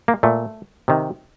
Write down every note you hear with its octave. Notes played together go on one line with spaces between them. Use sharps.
A#3
A#2 A3
C3 D#3